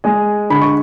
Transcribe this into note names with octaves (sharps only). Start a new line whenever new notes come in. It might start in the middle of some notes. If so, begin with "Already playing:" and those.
G#3 G#5
D3 B5
C#6